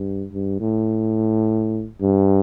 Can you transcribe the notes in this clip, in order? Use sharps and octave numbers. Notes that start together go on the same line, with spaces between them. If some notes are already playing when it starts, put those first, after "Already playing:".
Already playing: G2
G2
A2
G2